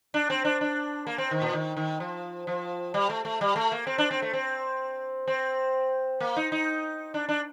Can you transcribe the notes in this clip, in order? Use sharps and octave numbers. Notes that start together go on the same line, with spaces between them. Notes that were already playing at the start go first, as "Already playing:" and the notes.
D4
C4
D4
D4
A#3
C4
D#3
A#2
D#3
D#3
F3
F3
G3
A3
A3
G3
A3
A#3
C4
D4
C4
A3
C4
C4
A#3
D#4
D#4
D4
D4